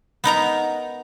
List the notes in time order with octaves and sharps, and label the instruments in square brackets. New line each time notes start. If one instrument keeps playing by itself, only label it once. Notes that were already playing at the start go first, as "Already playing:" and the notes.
[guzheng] B3 D#4 A#4 A#5